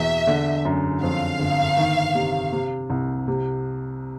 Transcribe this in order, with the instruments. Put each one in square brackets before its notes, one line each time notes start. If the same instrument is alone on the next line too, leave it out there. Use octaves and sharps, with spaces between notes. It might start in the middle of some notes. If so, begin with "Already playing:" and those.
Already playing: [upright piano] E2 B2 [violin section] E5
[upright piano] D3
F#2
[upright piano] F2 [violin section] F5
[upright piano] G1
D#3
C3
C3
C2
C3